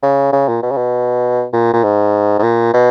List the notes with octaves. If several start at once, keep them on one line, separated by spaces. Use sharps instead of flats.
C#3
C#3
A#2
B2
C#3
B2
A#2
A#2
G#2
G#2
A#2
B2